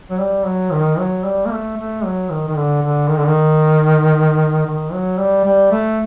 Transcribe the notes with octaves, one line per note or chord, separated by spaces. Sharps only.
F#3
G3
F#3
D#3
F#3
G3
A#3
A3
A3
F#3
D#3
D#3
D3
D3
D#3
D3
D#3
D#3
F#3
G3
G3
A3